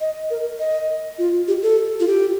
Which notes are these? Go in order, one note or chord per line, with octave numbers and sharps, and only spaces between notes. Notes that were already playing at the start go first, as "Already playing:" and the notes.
D#5
A#4
D#5
F4
G4
A4
F4
G4